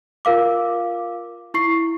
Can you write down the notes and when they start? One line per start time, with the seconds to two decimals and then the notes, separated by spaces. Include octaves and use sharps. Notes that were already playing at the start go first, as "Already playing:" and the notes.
0.25 F4 A#4 F5 D6
1.54 E4 C#6 C7